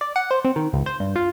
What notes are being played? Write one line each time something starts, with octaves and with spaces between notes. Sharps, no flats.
D5
F#5
C5
C4
D#3
C#2
C5
G2
F4